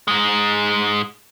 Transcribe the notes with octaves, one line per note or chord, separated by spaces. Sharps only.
G#2 G#3